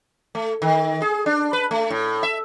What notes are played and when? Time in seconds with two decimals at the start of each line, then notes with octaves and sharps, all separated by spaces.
0.35 A3
0.62 D#3
1.02 G#4
1.26 D4
1.53 B4
1.71 A3
1.90 A2
2.23 E5